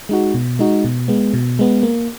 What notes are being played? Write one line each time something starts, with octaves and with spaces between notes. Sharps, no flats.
G#3 D#4 F#4
B2
G#3 D#4 F#4
B2
G#3 B3
B2
G#3 B3
A#3